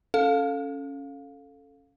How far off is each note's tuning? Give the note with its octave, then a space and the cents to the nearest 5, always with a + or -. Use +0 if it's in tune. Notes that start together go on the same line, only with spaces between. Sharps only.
C#4 +0 A4 +0 F5 +15